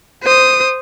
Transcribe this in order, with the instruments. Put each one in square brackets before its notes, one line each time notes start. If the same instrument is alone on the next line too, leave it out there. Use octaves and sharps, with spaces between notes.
[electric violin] C5 D#6